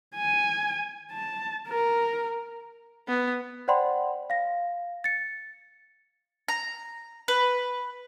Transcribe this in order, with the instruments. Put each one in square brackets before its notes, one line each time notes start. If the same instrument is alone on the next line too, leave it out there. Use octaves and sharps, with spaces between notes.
[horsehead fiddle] G#5
A5
A#4
[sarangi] B3
[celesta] C5 D5 F#5 G5 B5 C6
F5 A#6
A6 C#7
[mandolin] A#5
B4